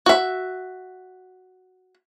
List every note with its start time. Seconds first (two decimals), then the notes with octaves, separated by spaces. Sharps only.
0.06 F#4 E5